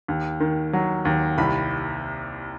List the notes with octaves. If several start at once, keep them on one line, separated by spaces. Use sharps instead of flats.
D#2
D#3
F#3
D#2
C2 B5